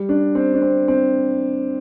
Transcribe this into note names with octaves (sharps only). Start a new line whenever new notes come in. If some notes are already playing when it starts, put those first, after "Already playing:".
Already playing: G3
D4
C4
D4
C4
C4